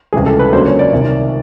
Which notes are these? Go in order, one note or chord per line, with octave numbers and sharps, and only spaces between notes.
C#2 C3 E3 G3 G#4
A4
B4
C#2 C#3 F#3 A#3 D4 C5
C#5
D5
C2 C3 D#3